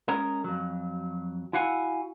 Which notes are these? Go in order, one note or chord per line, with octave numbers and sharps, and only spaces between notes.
G#3 C#4 A#4
F2 F#3
E4 F#4 F5 F#5 G#5